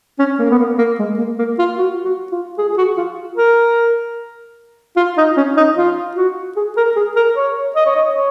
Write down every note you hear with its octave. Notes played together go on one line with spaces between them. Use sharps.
C#4
A#3
B3
A#3
A#3
G#3
A#3
A#3
F4
F#4
F#4
F4
G#4
G#4
F#4
F4
A#4
F4
D#4
C#4
D#4
F4
F#4
G#4
A#4
G#4
A#4
C#5
D#5
C#5
D#5
C#5